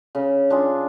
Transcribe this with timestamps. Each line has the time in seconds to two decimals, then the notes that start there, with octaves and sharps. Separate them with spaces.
0.15 C#3
0.50 D4 F4 G#4